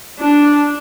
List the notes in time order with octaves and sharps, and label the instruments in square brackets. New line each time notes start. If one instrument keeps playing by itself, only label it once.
[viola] D4